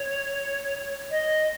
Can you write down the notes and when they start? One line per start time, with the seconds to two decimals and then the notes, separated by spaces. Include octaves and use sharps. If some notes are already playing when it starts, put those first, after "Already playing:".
Already playing: C#5
1.11 D#5